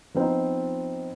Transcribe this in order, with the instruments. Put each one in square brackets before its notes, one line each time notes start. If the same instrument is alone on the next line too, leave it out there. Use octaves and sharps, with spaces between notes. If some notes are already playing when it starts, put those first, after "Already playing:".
[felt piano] F3 B3 C4 D#4 F4